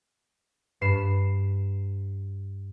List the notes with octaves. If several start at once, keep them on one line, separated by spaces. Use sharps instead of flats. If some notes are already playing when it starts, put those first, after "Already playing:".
G2 B4 C7 E7